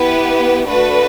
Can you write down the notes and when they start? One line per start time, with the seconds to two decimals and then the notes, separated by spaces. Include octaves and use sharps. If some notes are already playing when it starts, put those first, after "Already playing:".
Already playing: B3 E4 G4 B4
0.67 A3 D4 F#4 A4 B4